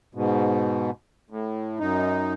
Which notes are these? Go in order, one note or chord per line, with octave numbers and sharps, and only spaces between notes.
G#2 B2
A2
F#2 D#4